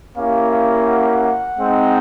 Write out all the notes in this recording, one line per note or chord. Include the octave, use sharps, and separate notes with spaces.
A#3 C#4 E4 G4 F5
F5
F#5
F#5
G#3 C4 D#4